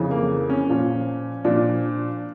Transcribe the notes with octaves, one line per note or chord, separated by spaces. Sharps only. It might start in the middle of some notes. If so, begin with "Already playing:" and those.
Already playing: F2 C#3 E3
A#3
C#4
A#2 F3
A#2 F3 D4